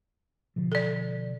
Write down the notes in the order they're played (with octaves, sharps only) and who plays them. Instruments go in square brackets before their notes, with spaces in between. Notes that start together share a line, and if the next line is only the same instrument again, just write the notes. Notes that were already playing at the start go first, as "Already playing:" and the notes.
[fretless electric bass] B2 D3 F3
[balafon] A4 D5